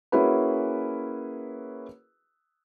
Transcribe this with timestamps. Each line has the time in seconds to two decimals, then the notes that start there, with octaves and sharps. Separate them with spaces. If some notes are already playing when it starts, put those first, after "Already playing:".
0.12 A#3 C#4 E4 F#4 G#4 B4